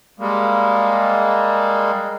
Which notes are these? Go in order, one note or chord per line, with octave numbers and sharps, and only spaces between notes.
G3 G#3 A#3